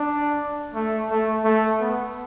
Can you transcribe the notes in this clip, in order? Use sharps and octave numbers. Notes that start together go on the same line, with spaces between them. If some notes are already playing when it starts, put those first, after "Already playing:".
Already playing: D4
A3
A3
A3
B3